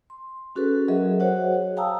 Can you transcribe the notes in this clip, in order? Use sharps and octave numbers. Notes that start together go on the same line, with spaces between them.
C6
C#4 F#4 G#4 A4 B4
F#3 G#4 A#4 D#5 E5
F#4 C5 C#5 D#5 F#5
G#4
F5 G5 A5 A#5 D#6 E6